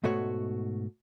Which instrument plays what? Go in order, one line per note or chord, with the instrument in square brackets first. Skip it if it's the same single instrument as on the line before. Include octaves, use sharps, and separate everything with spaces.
[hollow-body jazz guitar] G#2 B2 A3 F#4 C#5